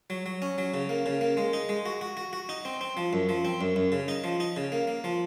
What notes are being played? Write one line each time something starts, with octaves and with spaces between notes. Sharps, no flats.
F#3
F#3
C#4
F#3
C#3
A#3
C#3
A#3
G#3
D#4
G#3
F#4
F#4
F#4
F#4
D#4
C4
C4
F3
F#2
F3
C4
F#2
F#2
C#3
D#4
F3
D#4
C#3
A#3
A#3
F3